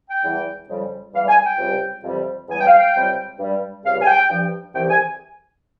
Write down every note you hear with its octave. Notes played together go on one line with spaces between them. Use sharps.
G5
E2 E3 G3
F2 C#3 G3
E2 E3 G3 F5
G#5
G5
C#2 C3 G3
F2 C3 E3 G3
E2 C#3 G3 G#5
G5
F5
G5
C#2 C3 G3
G2 G3
C#2 C3 G3 F5
G#5
G5
G2 F3
C2 C3 E3 G5
G#5